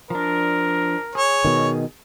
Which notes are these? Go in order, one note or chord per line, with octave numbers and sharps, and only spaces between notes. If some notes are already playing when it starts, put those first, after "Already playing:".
F3 D4 A#4
G#4 C#5
B2 D#3